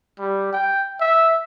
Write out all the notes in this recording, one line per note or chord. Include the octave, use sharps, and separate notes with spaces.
G3
G5
E5